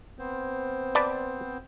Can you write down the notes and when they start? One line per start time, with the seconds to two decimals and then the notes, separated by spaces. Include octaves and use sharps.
0.19 B3 C4 C5
0.95 B4 D5 A5